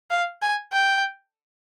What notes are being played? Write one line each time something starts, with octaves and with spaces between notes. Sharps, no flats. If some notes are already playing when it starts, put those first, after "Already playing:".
F5
G#5
G5